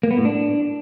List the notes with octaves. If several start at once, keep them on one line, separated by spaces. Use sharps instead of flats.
A#3
B3
A2
D4